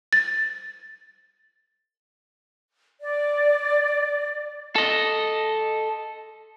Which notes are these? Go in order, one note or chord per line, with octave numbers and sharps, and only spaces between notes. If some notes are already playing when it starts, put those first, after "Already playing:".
A6
D5
A4 D#5